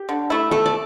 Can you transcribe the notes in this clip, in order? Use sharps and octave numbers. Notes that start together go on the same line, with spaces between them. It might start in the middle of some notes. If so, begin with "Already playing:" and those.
Already playing: G4
D3
A3 E4
A3 A4
D5